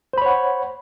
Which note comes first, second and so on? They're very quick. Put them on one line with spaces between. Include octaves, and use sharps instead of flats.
C5 B5 C#5 F#5